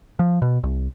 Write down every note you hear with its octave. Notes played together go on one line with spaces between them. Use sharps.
F3
B2
C2